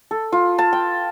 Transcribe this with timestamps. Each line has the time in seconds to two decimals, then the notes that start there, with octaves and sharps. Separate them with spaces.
0.11 A4
0.32 F4
0.59 A5
0.73 G5